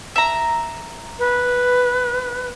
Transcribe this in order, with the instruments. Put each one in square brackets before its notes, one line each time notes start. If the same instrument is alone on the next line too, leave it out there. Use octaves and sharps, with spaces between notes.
[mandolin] E5 A#5
[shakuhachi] B4